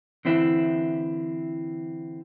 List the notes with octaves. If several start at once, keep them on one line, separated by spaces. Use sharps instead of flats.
D3 E3 C4 E4 E5